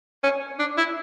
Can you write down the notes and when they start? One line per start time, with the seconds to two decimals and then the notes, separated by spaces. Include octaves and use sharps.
0.23 C#4
0.59 D4
0.78 E4